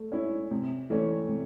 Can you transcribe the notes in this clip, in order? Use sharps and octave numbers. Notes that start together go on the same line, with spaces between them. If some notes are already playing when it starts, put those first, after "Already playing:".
Already playing: A3
C#4 E4
C3
E3 A3 C#4
C3